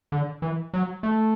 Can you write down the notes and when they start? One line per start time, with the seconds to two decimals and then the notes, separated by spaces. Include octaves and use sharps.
0.12 D3
0.42 E3
0.74 F#3
1.03 A3